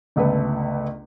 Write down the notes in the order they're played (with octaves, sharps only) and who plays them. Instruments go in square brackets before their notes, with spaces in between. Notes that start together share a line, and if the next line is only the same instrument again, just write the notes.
[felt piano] G1 C#2 A3 B4